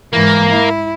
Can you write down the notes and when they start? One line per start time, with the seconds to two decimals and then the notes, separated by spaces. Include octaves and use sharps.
0.13 G#2 E3 A#3
0.51 E4